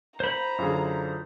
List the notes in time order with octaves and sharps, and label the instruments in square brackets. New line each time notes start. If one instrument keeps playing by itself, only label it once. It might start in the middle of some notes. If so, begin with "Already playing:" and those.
[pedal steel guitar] C5 B5 [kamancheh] A#5
[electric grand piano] F#2 D3 [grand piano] E4 F4 G#4